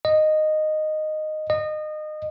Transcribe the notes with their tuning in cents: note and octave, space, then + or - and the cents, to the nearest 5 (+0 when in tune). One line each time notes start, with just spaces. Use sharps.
D#5 -10
D#5 -25